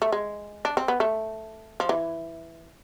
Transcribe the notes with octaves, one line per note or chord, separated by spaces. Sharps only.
A3
G#3
D4
C4
B3
A3
F3
E3